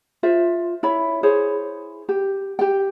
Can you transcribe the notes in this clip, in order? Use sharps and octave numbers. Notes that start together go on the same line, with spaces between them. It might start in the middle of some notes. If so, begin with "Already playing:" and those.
F4 C5 E5
E4 C#5 B5
E4 G#4 C5 C#5
G4
G4 G5